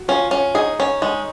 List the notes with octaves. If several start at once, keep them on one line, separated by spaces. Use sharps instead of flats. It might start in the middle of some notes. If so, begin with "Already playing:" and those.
Already playing: F#4
C#4 F4
C#4
D#4 G#4
C#4
G#3 D#4